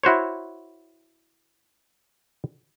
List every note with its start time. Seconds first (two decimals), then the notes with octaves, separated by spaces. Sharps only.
0.04 E4 F#4 C5 C#5